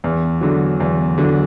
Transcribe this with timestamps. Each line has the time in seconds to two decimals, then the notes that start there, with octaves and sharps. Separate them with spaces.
0.04 E2
0.41 D3 F#3
0.80 E2
1.18 D3 F#3